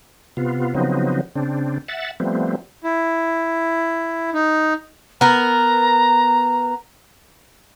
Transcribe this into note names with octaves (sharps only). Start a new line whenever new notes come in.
C3 B3 F4
C#3 F3 F#3 B3 C4 D#4
C#3 C4 D4
E5 F#5 A6
F3 G3 A3 B3 C4
E4
D#4
B3 A#4 A#5